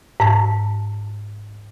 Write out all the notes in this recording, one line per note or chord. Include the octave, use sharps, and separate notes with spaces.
G#2 A5